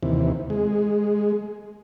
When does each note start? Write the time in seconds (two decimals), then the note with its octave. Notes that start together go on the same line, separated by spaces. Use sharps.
0.03 D#2 C3 E3
0.50 G#3